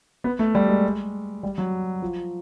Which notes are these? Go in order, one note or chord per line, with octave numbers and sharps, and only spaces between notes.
B3
A3
G3
G#3
G3
F#3
F3